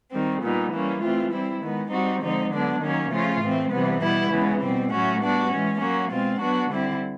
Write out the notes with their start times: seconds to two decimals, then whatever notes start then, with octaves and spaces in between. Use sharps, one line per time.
0.12 D#3 G3 C4
0.42 A#2 G3 B3 D#4
0.72 E3 G3 A#3 C#4
1.02 E3 A3 C4 F4
1.32 G3 C4 E4
1.62 D#3 G#3 B3
1.91 G3 C4 D#4 F#4
2.22 D3 F3 G#3 C4 D#4
2.51 D3 F#3 B3 D4
2.81 D#3 F#3 A#3 C#4
3.11 C#3 F3 A3 C#4 F4
3.41 A2 E3 A3 C4
3.71 C3 E3 G3 B3
4.01 B2 G3 B3 E4
4.31 C#3 E3 G#3 B3
4.61 B2 G3 C4
4.91 A2 F#3 A3 C#4 F#4
5.20 G3 B3 D4 F#4
5.50 E3 G#3 C#4
5.80 F#3 A#3 C#4 F#4
6.10 B2 G#3 C4 F4
6.40 F#3 B3 D4 F#4
6.70 D3 G3 C4 E4